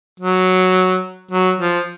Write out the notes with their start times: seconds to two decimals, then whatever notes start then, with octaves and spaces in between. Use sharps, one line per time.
0.20 F#3
1.31 F#3
1.59 F3